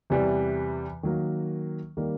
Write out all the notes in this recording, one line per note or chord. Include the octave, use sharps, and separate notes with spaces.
E2 C3 E3 G3
D#3 F#3 A#3
D#3 G3 A#3